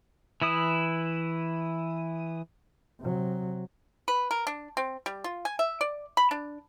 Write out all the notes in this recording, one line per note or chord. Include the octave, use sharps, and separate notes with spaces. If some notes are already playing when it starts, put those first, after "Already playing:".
E3 E4 D#6
C3 F#3
B4
A#4
D4
C4
G3
F4
G#5
E5
D5
B5
D4